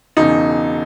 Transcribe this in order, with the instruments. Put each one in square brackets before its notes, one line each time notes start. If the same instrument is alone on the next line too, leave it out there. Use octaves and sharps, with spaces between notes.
[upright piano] E1 E2 C#3 D#4